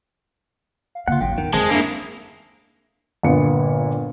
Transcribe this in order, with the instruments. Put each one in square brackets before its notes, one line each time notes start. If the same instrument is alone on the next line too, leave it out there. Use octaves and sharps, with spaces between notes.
[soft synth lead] F5
[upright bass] C#3 A#3 [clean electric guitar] F4 F#5
[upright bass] A1 [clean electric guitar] F#2 [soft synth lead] G5
[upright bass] E2 [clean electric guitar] D#3
[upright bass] F#2 [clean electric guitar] D#3 C4 A5 [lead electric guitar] G#3 [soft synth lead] D#6
[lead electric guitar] A#3 E4 [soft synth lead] D4 [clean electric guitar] G#4 A4
[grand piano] G1 A#2 B3 C#7